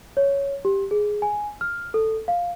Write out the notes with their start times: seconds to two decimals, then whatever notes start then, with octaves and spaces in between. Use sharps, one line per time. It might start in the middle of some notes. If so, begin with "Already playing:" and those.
0.17 C#5
0.65 G4
0.91 G#4
1.22 G#5
1.61 F6
1.94 A4
2.28 F5